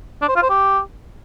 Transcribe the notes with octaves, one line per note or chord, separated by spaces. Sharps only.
D4
C5
F4
C5
G4